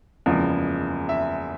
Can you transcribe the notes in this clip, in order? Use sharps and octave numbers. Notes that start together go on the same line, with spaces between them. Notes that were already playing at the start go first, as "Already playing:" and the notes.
F#1 E2 C#3 F3 G#3
E5